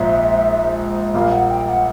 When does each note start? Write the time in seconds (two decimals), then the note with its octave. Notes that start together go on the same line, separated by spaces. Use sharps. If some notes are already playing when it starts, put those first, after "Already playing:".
Already playing: A#1 G#2 F3 E5
1.14 A#1 A#2 G3 A#3 F5
1.31 F#5
1.49 G5
1.68 F#5